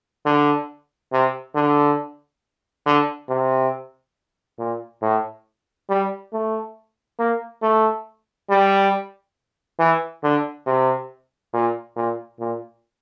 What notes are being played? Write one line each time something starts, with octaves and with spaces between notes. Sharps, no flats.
D3
C3
D3
D3
C3
A#2
A2
G3
A3
A#3
A3
G3
E3
D3
C3
A#2
A#2
A#2